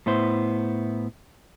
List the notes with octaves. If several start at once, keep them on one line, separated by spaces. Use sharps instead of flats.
A2 B3 E4 C5